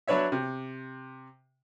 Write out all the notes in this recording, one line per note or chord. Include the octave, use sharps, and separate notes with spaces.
F#3 D4 B4 C#5 E5
C3